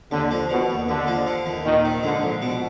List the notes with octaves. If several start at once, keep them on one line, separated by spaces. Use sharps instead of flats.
D#2 D3
F3
B2 D3
D#2
D#2 D3
F3
D3
D#2
A#1 D#3
D#3
G#2 D3
A#1
B2